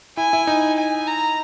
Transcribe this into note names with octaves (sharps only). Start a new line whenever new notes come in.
E4 G#5
E4
D#4
G#5
A#5